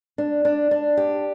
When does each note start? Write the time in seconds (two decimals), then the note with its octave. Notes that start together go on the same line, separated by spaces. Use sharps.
0.18 D4
0.45 D4
0.71 D4
0.97 G4